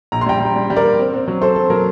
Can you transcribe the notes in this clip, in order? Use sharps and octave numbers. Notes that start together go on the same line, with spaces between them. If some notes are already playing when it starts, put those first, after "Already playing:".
A#1 A#5
C6
G3 G5 A#5
G3
G3
G3
A#4 D5
A#3
C4
C4
F#3
C4 A4 C5
F#3 A4
F#3 A#4